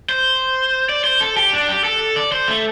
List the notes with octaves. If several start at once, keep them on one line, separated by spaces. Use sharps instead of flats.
C5
D5
C5
A4
G4
D4
G4
A4
D5
C5
A3